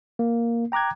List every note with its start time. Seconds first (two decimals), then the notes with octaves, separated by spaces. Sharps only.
0.19 A#3
0.72 G5 A#5 D6 F#6 G#6